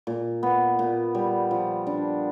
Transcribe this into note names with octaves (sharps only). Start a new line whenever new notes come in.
A#2
B3
A#2
G3
F3
D4